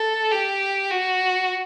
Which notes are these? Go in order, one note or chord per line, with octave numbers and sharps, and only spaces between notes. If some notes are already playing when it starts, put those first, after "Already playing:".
Already playing: A4
G4
F#4